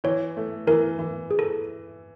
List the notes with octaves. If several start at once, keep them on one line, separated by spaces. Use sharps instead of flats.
E3 C#5
A3
E3 A#4
E3
G#4
A4